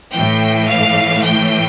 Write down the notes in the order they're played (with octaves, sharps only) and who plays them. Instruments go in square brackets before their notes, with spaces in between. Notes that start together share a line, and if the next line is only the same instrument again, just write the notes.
[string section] A2 E3 G5
F5
G5